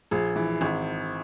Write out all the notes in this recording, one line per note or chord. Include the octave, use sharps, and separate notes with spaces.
A#1 G#4
E3
G#1